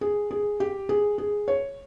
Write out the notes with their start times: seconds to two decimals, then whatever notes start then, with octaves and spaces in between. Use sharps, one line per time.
0.01 G#4
0.31 G#4
0.60 G4
0.89 G#4
1.18 G#4
1.48 C#5